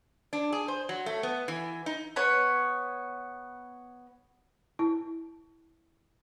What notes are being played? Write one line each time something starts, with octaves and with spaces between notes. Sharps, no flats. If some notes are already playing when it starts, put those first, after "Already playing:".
D4
G#4
C5
F#3
A3
B3
E3
D#4
B3 C#5
E4 A5